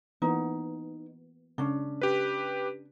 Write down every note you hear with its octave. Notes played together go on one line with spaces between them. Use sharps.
E3 A#3 B3 D#4
C#3 C#4 D4
G4 B4